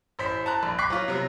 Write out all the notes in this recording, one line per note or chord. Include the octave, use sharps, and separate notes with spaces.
A1 C5 B6
A5 A#5 F#6
A#1
C#6 D6 F#6 B6 C7
F#3 F4
C3 F#3 A#5